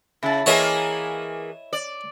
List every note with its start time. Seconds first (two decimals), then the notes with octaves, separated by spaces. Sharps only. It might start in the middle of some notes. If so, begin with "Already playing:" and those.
0.23 C#3 E4 A5
0.46 E3 A#3 G#4 C#5 D#5 E5
1.73 D5